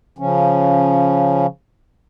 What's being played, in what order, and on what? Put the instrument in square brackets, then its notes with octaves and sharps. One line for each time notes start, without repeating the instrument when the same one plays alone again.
[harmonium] C#3 F3 C#4